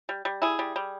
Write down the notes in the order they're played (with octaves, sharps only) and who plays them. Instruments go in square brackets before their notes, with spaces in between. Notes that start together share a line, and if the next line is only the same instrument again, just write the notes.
[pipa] G3
G3
E4 G#4
G3
G3